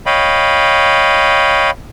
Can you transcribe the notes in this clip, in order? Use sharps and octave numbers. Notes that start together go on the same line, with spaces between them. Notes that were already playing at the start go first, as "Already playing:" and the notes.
C#5 D#5 F5 G5 B5